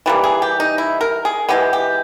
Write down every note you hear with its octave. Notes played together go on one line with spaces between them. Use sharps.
E3 G3 A#3
G#4
G4
D#4
E4
A#4
G#4
E3 G#3 B3 G4
G4